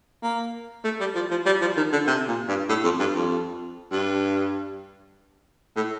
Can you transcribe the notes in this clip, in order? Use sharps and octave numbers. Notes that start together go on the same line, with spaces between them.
A#3
A3
G3
F3
F3
G3
F3
D#3
D3
C3
A#2
G2
A2
F2
G2
F2
G2
A2